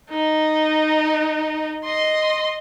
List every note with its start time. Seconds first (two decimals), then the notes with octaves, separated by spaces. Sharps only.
0.10 D#4
1.84 D#5 C6